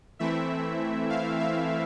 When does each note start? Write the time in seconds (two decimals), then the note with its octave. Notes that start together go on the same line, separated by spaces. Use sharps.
0.19 E3 A3 C4 E4 E5
1.10 F5
1.40 E5